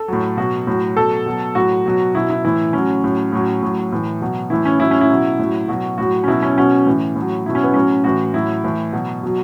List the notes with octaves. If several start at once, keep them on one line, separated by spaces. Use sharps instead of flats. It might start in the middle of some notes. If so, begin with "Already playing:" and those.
Already playing: A4
A2 F#3
B2 F#3 F#4
A2 F#3
B2 F#3 A4
B2 F#3
A2 F#3 F#4
B2 F#3
B2 F#3 E4
E4
A2 E3 E4
A2 F#3 C#4
A2 F#3
A2 F#3
A2 F#3
A2 E3
B2 F#3
A2 E3 E4
C#4
A2 F#3 E4
C#4
E4
B2 F#3
A2 F#3
B2 F#3 F#4
A2 F#3 F#4
C#4
B2 F#3 E4
C#4
B2 F#3 C#4
A2 E3
A2
F#3
B2 F#3 E4
C#4
B3
A2 F#3 C#4
A2 E3 F#4
A2 F#3 E4
A2 E3
B2 F#3
B2 F#3